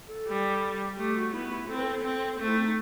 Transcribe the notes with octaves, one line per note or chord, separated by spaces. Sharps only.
A4
G3
A3 G4
F#4
B3 E4
E4
C4 A4
B4
A4
C4
A3 A4
E4
C4
D#4